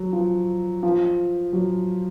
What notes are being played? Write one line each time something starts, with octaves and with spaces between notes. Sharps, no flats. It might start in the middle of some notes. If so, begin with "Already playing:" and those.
Already playing: F#3
F3
F3
F#3